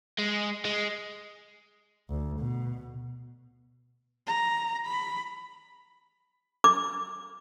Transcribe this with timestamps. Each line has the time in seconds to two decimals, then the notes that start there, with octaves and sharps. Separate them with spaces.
0.19 G#3
0.65 G#3
2.10 D2
2.39 B2
4.27 A#5
4.86 B5
6.64 D6